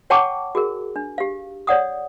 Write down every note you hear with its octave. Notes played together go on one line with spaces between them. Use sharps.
C#5 F#5 G5 A5 C#6 D6
F#4 G#4 A#4
D4
G4 F5
C#5 D5 F#5 D#6